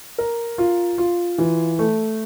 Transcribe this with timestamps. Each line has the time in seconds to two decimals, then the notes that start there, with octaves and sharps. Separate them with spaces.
0.18 A#4
0.58 F4
0.98 F4
1.38 E3
1.79 A3